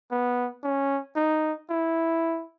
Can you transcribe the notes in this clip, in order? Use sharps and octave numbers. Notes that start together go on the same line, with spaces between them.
B3
C#4
D#4
E4